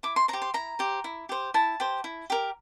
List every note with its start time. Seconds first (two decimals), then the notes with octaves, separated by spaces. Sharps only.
0.03 E4 D6
0.16 C6
0.28 C5 A#5
0.33 G4
0.42 C6
0.54 E4 A#5
0.79 G4 C5
1.04 E4
1.29 G4 C5
1.54 E4 A5
1.80 G4 C5
2.04 E4
2.30 G4 A#4